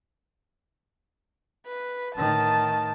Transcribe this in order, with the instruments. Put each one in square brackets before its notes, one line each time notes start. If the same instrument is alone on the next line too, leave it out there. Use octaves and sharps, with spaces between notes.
[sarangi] B4
[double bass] A2 D#3 [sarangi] A5